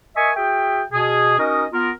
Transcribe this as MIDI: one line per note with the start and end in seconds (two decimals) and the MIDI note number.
0.16 0.31 70
0.16 0.31 75
0.16 0.31 76
0.16 0.31 80
0.16 0.31 85
0.16 0.31 87
0.36 0.82 66
0.36 0.82 68
0.36 0.82 76
0.36 0.82 79
0.92 1.36 47
0.92 1.36 68
1.39 1.65 61
1.39 1.65 63
1.39 1.65 66
1.39 1.65 70
1.39 1.65 75
1.73 1.90 59
1.73 1.90 65
1.73 1.90 70